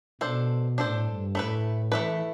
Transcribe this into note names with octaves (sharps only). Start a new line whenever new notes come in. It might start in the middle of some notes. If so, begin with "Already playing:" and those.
B2 D4 A4 C5
A2 D4 A4 C5
G2
A2 A3 E4 B4
E3 A3 E4 B4